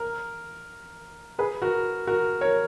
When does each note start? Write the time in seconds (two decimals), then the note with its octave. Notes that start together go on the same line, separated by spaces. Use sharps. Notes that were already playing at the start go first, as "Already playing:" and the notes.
Already playing: A#4
1.39 G#4 B4
1.62 F#4 A#4
2.07 F#4 A#4
2.41 A#4 C#5